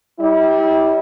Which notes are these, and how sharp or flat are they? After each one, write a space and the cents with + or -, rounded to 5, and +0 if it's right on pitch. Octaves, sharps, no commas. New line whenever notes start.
G3 +0 E4 -40